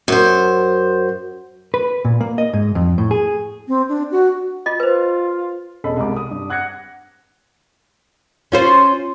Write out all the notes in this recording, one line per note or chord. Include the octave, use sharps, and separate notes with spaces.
F#2 C5
B4
A#2
A#3
D#5
G#2
F2
A2
G#4
C4
D4
F#4
F4 D#5
F4 B4 C5
E1 C#4 A4 D#5 B5
C2 G#3 A#5 D6
D#6
G2
F#5 F#6 G#6 A#6 C#7
C#4 F4 C5